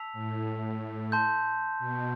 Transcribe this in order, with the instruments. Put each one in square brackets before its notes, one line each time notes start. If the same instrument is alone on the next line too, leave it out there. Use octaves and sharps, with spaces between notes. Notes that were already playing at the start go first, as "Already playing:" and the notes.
Already playing: [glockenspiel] A5 E6 B6 F7
[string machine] A2
[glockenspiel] A5 C6 G6
[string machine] B2